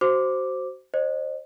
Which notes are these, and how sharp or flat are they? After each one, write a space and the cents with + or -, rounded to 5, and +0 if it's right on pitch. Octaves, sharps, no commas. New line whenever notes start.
F#4 +25 C5 +0 D6 +0
C5 +25 D#5 -45